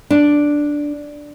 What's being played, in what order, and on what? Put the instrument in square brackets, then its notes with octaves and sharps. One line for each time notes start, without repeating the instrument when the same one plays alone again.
[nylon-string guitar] D4